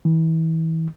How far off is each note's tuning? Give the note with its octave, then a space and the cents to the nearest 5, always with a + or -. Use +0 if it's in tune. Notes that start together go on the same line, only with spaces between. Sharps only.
E3 -30